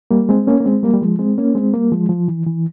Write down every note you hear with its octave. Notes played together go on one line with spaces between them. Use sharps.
G3 A#3
G#3 C4
A#3 C#4
A#3
G#3 C4
G3 A#3
G3
F3 G#3
G#3 C4
A#3 C#4
G#3 C4
G3 A#3
F3 G#3
F3
E3
E3